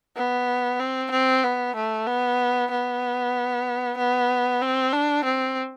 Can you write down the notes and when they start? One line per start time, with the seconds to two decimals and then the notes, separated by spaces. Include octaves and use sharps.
0.16 B3
0.80 C4
1.11 C4
1.44 B3
1.76 A3
2.06 B3
2.71 B3
3.98 B3
4.62 C4
4.93 D4
5.25 C4